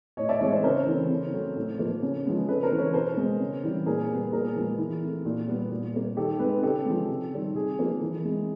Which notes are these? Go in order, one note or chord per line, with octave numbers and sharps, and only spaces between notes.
A2 C#5 D#5
D5 E5
E3 G#3 C4 C#5 D#5
C5 D5
C#3 A#4 C5
E3 A3 C4
C#3
F#3 A3 C4
A2
F3 A#3
C#3
F3 G#3 B3
C#3 A4 B4
A#4 C5
E3 A3 C4
B4 C#5
B2 A#4 C5
G#3 B3
C#3
E3 G3 C4
A#2 G#4 A#4
G3 B3
A#2 G#4 A#4
F3 G#3 B3
E3
A3 C4
A#2
G3 B3
A#2
G3 A#3
D#3 G4 A4
G#3 C4 A4 B4
C#3 G4 A4
F3 G#3
C3
D#3 G3 C4
C3 G#4
F3 A#3
E3
G#3 C4